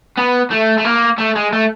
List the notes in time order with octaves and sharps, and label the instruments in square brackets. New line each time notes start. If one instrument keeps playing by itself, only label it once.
[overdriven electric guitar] B3
A3
A3
A#3
A3
G#3
A3